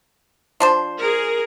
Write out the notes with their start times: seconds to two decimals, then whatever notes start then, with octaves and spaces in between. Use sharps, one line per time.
0.60 F3 D4 C5
0.99 G#4 A#4